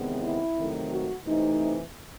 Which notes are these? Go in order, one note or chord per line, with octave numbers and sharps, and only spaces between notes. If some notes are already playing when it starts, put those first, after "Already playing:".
Already playing: E2 C3 D#3 G#3 B3
E4
F2 C3 D#3 F#3 A3
F#4
C3 E3 A3 C4 D#4